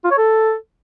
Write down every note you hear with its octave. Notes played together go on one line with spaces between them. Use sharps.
F4
C#5
A4